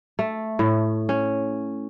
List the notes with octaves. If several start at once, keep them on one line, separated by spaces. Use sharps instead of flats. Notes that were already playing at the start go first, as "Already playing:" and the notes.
A3
A2
C#4